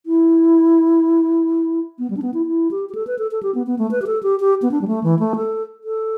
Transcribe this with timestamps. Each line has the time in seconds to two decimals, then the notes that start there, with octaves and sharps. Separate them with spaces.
0.06 E4
1.99 B3
2.10 G3
2.17 D4
2.22 B3
2.34 E4
2.46 E4
2.71 G4
2.89 G4
2.95 A4
3.07 B4
3.19 A4
3.31 A4
3.43 G4
3.55 B3
3.67 B3
3.79 A3
3.91 B4
4.02 G4
4.07 A4
4.23 G4
4.40 G4
4.62 B3
4.72 D4
4.81 G3
4.88 A3
5.04 E3
5.19 A3
5.36 A4
5.84 A4